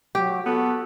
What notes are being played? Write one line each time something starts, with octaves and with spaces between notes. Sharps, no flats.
F#3 G4
B3 F#4 A4